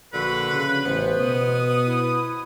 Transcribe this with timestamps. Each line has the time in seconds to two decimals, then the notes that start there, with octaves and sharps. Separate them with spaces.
0.13 A#1 D3 F#4 B4
0.53 C#3
0.85 A1 B3 C5
1.20 B2 D#6
1.86 E4